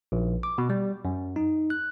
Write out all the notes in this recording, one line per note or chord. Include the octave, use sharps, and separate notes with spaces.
A#1
D6
B2
G3
F#2
D#4
F#6